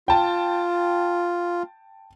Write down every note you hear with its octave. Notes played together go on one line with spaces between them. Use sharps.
F4 G5 A5